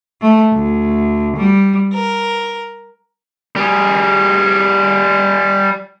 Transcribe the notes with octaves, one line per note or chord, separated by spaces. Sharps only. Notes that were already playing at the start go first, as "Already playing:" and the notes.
A3
D2
G3
A#4
G3 G#4